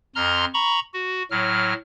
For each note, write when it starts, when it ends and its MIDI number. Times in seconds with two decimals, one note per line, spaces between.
0.15 0.45 41
0.15 0.45 82
0.15 0.45 84
0.15 0.45 89
0.54 0.80 82
0.54 0.80 83
0.54 0.80 85
0.94 1.23 66
1.31 1.73 45
1.31 1.73 54
1.31 1.73 89